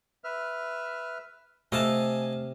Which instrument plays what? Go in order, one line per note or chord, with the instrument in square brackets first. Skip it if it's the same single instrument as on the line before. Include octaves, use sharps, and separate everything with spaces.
[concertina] B4 E5 F6
[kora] C3 [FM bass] A3 [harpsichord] D#5 F5 A5 [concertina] G#5